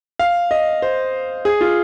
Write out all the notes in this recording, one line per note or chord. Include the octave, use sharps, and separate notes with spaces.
F5
D#5
C5
G#4
F4